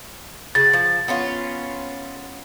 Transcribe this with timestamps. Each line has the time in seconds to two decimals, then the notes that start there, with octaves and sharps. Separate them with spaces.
0.55 C#3 F#4 A6
0.73 F3
1.08 B3 C#4 F4